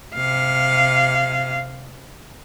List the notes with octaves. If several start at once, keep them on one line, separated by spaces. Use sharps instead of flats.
C3 F5